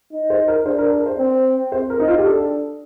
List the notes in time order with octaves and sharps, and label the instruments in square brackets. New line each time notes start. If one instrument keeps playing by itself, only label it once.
[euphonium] D#4
[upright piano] C5
A#4
[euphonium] D4 [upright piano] C5
[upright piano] A#4
A#4
C5
[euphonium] C4
[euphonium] C4 [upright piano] C5
[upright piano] A#4
D#4
F4
G4
[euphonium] D4 [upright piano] A4